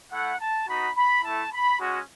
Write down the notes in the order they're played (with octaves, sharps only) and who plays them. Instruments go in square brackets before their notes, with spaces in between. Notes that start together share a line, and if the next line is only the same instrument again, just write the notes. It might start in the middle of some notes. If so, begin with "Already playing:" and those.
[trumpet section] A3 E4 F#5
A5
B3 D#4 F#4 B5
B5
A3 E4 A5
B5
G#3 C#4 F#4